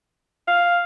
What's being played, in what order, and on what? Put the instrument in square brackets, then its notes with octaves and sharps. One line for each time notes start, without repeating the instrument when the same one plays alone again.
[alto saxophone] F5